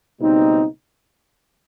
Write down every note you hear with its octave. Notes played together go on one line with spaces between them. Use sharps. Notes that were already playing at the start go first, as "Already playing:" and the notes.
C#2 B2 G3 C4 D#4